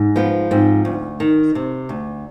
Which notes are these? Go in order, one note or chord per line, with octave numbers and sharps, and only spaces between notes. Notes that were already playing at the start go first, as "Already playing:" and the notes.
Already playing: G#2
F3 B3
G#2 C4
D2
D#3
C3
D2